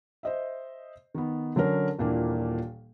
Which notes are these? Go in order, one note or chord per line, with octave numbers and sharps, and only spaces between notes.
C5 D#5 E5
D#3 B3
D3 F#3 C#4 A#4
D#1 A#2 E3 A#3 D4